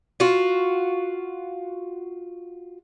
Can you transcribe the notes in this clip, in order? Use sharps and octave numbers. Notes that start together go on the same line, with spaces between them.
F4 F#4